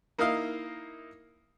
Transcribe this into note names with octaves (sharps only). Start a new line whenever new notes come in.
A#3 D#4 E4 D#5 F5 D#6